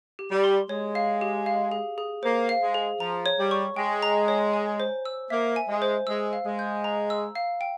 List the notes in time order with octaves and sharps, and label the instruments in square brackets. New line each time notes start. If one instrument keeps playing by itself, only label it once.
[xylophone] G4
[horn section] G3
[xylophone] C6
[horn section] G#3 [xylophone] C#5
[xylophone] F5
G4
F5
G#4
G#4
[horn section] A#3 [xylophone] C5
[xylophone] F5
[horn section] G#3
[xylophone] G#4
[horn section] F3 [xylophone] A#5
[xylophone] C#5
[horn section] G3
[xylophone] C#6
[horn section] G#3 [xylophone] G5
[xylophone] A#5
C#5
G#5
C5
E6
[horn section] A#3 [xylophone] E5
[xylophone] G#5
[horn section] G#3
[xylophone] C5
[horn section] G#3 [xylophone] E6
[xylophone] F5
[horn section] G#3
[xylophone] G6
A#5
E6
F5
G5